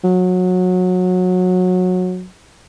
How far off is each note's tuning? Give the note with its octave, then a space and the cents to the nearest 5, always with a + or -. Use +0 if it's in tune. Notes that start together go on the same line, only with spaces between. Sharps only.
F#3 -20